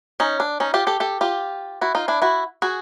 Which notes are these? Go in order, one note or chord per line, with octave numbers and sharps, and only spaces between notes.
C#4 D#4
D4
C#4 D#4
F4 G4
G4 A4
G4 A4
F4 G4
E4 F#4
D#4 F4
D4 E4
E4 F#4
F#4 G#4